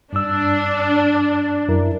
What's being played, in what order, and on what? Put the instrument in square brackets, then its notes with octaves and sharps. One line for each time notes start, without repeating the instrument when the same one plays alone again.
[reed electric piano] G2 E6 [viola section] D4
[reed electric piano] F#2 E4 A#4